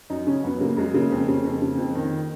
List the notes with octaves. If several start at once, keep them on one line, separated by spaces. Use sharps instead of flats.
F#2 D#4
C#3 C#4
F#2 B3
C#3 A#3
F#2 G#3
C#3 A#3
F2
C#3
F2
C#3
F2
D#3